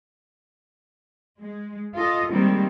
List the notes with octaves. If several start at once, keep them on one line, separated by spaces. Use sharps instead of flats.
G#3
F4 A4 D#5
D#3 G3 G#3 A#3 C4